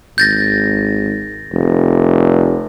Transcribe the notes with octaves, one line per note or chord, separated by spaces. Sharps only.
G#1 G6 A6 A#6
F1